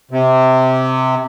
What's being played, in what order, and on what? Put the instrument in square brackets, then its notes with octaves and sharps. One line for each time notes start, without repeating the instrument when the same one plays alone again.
[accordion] C3